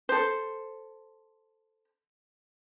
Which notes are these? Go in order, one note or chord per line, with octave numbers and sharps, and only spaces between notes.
A4 C5